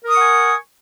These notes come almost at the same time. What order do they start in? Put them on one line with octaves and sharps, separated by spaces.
A#4 D#6 C#6 F#5 G#5